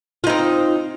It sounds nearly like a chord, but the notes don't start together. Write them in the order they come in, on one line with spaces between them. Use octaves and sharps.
F4 D#4 C4